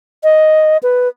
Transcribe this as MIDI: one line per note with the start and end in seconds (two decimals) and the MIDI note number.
0.23 0.77 75
0.83 1.08 71